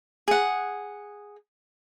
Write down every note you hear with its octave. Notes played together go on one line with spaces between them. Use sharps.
G#4 F#5